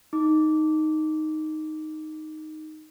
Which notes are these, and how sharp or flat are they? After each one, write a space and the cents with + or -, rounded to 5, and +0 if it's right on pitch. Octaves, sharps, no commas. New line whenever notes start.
D#4 +0 D6 -15